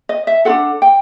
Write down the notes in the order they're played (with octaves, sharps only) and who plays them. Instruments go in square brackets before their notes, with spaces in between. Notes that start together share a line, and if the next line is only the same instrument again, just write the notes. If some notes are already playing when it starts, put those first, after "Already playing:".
[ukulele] D#5
E5
D4 F4 A4 F#5
G5